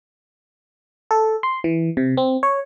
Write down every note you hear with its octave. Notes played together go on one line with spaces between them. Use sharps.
A4
C6
E3
C3
C4
C#5